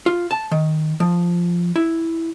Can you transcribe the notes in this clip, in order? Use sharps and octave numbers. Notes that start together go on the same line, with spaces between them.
F4
A5
D#3
F3
E4